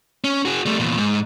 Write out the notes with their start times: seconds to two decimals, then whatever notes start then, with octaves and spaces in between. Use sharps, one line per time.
0.24 C#4
0.45 F#4 G#4
0.66 G3 A3
0.79 E2 A#2
0.98 G#2